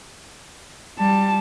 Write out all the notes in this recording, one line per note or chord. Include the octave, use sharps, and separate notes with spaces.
G3 A5